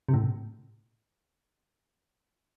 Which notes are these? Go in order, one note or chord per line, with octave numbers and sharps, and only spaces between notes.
C3
A2